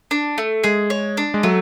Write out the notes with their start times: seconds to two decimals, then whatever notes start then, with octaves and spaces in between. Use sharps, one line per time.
0.11 D4
0.38 A3
0.64 G#3 G#4
0.90 C#5
1.17 D4
1.34 G#3
1.43 F#3 A3